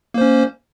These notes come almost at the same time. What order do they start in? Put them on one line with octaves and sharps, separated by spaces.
A#3 C5 C#4